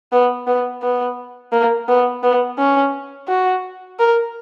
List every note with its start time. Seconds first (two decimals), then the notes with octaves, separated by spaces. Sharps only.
0.12 B3
0.47 B3
0.82 B3
1.53 A#3
1.88 B3
2.23 B3
2.58 C#4
3.28 F#4
3.99 A#4